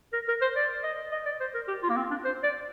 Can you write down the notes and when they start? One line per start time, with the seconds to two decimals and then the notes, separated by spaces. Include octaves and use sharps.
0.13 A#4
0.28 A#4
0.41 C5
0.56 D5
0.83 D#5
1.12 D#5
1.25 D5
1.40 C5
1.55 A#4
1.68 G4
1.83 F4
1.90 A#3
1.97 C4
2.10 D4
2.25 C5
2.43 D5